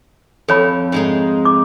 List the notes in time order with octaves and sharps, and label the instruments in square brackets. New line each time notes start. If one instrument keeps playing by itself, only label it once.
[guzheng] F2 [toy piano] A4 C#5 B5
[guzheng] G#2 G#3 D#4
[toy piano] D6